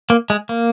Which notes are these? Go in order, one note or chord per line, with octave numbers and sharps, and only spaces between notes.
A#3
G#3
A#3